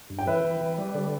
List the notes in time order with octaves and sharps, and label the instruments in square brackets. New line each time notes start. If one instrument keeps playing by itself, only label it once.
[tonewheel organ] G2
[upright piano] G5
[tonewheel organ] E3 [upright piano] B4 E5
[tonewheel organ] E3
E3
G3
D3